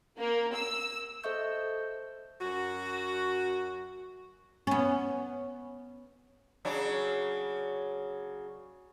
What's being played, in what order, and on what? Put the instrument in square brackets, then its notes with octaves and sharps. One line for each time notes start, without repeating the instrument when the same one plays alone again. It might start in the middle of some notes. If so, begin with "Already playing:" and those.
[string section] A#3
E6
[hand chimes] A4 C5 D#5 E5 C#6 G6
[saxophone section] F#2 F#4
[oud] B3 C#4
[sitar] C#3 F#3 D4